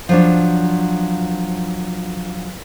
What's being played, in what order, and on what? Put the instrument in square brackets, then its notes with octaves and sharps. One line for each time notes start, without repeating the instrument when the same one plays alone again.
[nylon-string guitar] F3 F#3 D4